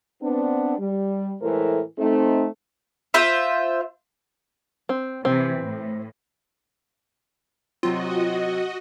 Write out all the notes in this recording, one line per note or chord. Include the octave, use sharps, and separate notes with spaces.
B3 C4 D4
G3
A2 E3 G#3 A3 A#4 C5
A3 C4 D#4
F4 C5 E5
C4
C3 E3 C4
A2
C3 F#3 C4 F4 F#4 D#5